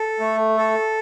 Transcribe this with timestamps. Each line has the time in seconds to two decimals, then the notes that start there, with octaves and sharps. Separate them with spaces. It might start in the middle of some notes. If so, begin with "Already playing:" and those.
Already playing: A4
0.20 A3
0.57 A4